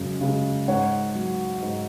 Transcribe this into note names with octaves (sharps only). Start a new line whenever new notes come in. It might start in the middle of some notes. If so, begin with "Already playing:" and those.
Already playing: F#2 C#3 G#3
C#3 G#3
G#2 C#5 F#5
F#3
G#2